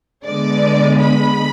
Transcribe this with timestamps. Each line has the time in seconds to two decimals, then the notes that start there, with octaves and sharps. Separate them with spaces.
0.24 D3 G#3 B3 D5
1.00 B5